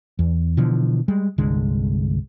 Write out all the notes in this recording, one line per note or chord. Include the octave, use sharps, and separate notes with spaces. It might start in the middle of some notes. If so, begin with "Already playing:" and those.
E2
B2 D3 E3 F3
G3 G#3
G1 C2 D3 G#3